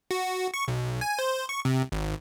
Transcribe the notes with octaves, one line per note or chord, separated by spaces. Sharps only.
F#4
C#6
B1
G#5
C5
C#6
C3
G#1